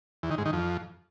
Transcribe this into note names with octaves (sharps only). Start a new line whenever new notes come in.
E2
D#3
G#2
D#3
F2